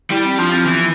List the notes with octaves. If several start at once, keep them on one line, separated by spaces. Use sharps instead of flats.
G3 E4
C4
F3 D4
C4
E3 B3